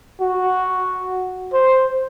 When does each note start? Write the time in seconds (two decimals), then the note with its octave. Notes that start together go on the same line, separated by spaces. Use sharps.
0.21 F#4
1.53 C5